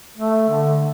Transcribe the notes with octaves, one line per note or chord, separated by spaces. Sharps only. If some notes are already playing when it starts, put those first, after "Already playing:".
A3
D3